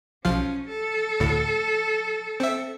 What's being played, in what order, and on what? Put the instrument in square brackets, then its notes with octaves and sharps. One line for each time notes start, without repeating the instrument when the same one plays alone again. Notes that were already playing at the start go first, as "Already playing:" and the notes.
[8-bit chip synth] B1 F3 F5 [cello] C#4
[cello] A4
[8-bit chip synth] D2 A2
C4 E5